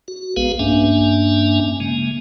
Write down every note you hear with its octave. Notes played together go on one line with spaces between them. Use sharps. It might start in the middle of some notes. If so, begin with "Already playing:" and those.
F#4
A#1 G#3 B3 G#4 B4 F5
G2 A#3 C#4 D4 E5 G#5
C#3 G#3 A#3